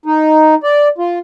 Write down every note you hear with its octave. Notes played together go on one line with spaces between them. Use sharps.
D#4
D5
F4